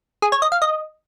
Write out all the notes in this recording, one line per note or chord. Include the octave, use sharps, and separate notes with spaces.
G#4
C#5
D#5
F5
D#5